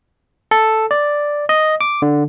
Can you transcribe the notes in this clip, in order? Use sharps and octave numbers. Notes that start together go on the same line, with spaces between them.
A4
D5
D#5
D6
D3